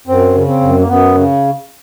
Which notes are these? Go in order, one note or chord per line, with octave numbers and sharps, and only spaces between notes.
F#2 C4
C#3
C4
F#2
A#3
F#2 B3
C#3